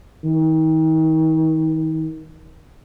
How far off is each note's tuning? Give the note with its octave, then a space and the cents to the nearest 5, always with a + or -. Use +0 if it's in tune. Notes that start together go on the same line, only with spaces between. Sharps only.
D#3 +35